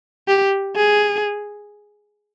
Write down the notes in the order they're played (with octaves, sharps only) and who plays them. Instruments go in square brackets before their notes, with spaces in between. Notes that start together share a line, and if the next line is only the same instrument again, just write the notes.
[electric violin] G4
G#4